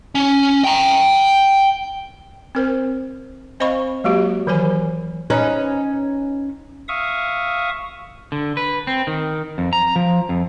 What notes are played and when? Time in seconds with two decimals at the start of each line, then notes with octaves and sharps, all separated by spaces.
0.15 C#4
0.65 G5 A#5
2.55 C4 A#4 C5
3.60 C4 C5 D#5 F5 B5 C#6
4.04 F#3 G#3 A#3 F#4 G4
4.47 D#3 E3 F#3 A#4 C5 G#5
5.30 C#4 D#4 B4
6.88 E5 F5 C#6 D#6
8.32 D3
8.57 B4
8.87 C4
9.07 D#3
9.58 F2
9.73 A#5
9.96 F3
10.29 F2